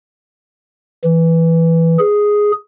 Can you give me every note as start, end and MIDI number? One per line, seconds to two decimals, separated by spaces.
1.04 1.98 52
1.99 2.52 68